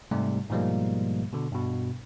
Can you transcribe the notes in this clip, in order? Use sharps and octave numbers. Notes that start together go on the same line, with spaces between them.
G#2 C3 G3 A3
G#2 B2 F3 G3 G#3 A#3
B2 D3
G2 B2